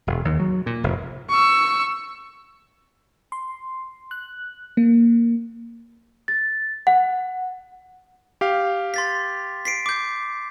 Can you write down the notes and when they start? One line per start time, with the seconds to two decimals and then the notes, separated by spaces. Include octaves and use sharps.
0.07 E1
0.25 D#2
0.40 F#3
0.66 A#2
0.84 F1
1.30 C#6 E6
3.32 C6
4.11 F#6
4.77 A#3
6.28 A6
6.87 F#5
8.41 G4 F5
8.94 C6 A6 B6
9.65 B6 C7 D7
9.86 D6 G6